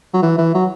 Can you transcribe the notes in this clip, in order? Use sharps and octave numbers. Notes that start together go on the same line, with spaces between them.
F#3
E3
E3
F#3